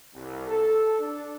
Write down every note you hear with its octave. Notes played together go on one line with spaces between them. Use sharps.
C2
A4
D4